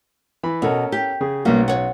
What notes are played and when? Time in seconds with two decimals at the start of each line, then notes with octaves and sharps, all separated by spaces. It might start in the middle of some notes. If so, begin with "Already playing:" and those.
0.43 E3 B5
0.62 B2 C#4 A4 A#4
0.92 G4
1.21 C#3 G#4
1.45 B1 G3 A#3 C#4 F#4
1.68 C#5 F#5